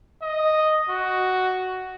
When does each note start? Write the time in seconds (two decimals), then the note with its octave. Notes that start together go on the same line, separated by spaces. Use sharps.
0.22 D#5
0.89 F#4